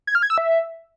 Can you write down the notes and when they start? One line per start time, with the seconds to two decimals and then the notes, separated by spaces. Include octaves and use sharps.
0.07 G#6
0.15 F6
0.23 G#6
0.30 E6
0.38 E5